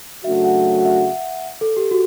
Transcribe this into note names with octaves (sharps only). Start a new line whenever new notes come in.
C#3 F#3 A3 D4 F#4 E5
F#5
F#5
E5
A4
G4
F#4